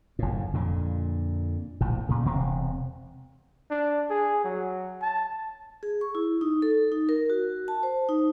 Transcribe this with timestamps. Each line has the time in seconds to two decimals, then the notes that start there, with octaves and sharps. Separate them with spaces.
0.19 F#1 A2
0.53 F2 A#2 D3
1.81 A#1 A2
2.09 A#2 C#3
2.25 E1 C3 C4
3.71 D4
4.10 G#4
4.44 F#3
5.02 A5
5.83 G#4
6.01 C#6
6.15 E4
6.41 D#4
6.62 A4
6.92 D#4
7.09 A#4
7.30 F#4
7.68 A5
7.83 C5
8.09 D#4